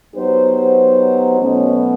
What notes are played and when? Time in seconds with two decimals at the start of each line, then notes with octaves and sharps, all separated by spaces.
0.15 F#3 B3 D#4 G4 C5
1.39 B2 F#3 A3 C#4